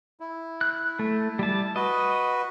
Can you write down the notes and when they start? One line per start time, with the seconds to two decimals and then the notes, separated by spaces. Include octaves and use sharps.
0.20 E4
0.61 F#6
0.99 A3
1.39 G3 A5
1.76 F#4 B4 D#5